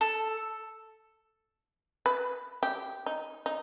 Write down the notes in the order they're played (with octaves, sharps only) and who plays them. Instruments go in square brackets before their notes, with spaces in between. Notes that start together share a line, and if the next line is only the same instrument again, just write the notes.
[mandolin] A4
[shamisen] B4
G4
D#4
D#4